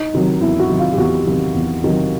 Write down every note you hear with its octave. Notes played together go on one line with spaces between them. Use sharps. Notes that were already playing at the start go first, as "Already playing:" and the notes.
Already playing: D#4
C3 D#3 F#3
E2 E4
F#4
C3 D#3 F#3
F4
G4
E2 F#4
C3 D#3 F#3
E2
C3 D#3 F#3